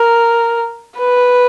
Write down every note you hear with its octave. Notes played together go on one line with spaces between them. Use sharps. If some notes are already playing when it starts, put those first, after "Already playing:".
Already playing: A#4
B4